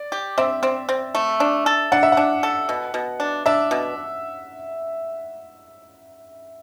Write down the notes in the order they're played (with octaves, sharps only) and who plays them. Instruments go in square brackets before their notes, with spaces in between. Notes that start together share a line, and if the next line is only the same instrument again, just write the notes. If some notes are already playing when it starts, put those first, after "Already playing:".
Already playing: [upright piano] D5
[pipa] G4
[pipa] C4 [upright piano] E5
[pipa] C4
C4
A3
D4
A4
[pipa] D4 [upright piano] F#5
[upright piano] E5
[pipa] D4 [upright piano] F#5
[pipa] A4
B2
B2
D4
[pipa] D4 [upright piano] E5
[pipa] B2